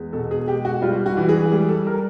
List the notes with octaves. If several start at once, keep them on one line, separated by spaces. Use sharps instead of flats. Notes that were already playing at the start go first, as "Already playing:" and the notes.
Already playing: E2 G#3
B2 A4
G#4
G#3 G4
F#4
G3 F4
F#4
E3
G#4
G3 G#4
A4
A#4